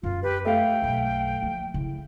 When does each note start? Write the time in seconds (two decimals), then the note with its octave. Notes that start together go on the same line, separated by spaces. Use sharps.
0.03 F#2 C#4 F4
0.22 G4 B4
0.45 A3 F5 G5
0.82 F#1 B1
1.42 F3 A#3
1.74 C#3 E4